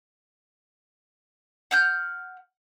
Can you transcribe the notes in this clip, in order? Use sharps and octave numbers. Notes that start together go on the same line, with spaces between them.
F#5 F6 G6